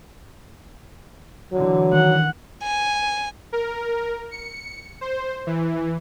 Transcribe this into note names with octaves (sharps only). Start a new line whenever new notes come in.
D3 E3 F#3
D#3 F#5
G#5
A#4
C#7
C5
E3